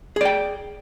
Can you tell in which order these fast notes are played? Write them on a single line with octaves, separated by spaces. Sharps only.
G#4 D5 G5